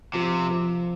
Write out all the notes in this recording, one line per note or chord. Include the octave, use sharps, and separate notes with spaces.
C3 F3
F3